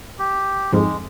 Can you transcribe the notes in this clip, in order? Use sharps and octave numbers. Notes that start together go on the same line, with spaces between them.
G4
F2 G#2 G#3